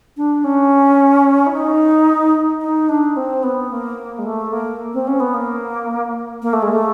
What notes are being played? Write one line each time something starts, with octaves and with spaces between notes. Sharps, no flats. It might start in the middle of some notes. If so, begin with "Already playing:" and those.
D4
C#4
E4
D#4
D#4
D4
C4
B3
A#3
G#3
A3
A#3
C4
C#4
B3
A#3
A#3
A3
G#3
A3